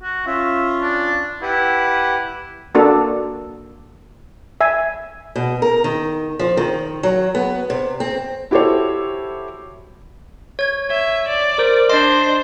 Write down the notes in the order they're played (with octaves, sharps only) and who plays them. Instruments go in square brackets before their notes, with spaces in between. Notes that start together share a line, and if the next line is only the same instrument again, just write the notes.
[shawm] F#4
[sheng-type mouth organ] C#4 F4 [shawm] E5
[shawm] D4
[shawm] E4 [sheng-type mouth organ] G4 B4 F#5
[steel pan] A#3 D4 F#4 A4
E5 G#5
[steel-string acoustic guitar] B2
A#4
D#3
F3
D#3
F#3
B3
C3
C4
[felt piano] E4 F#4 G4 A4 C5 C#5
[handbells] C#5 G#6
[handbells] C#5 [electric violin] E5
[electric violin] D5
[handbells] A#4 C5
[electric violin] D4 C5 [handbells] D#5 C6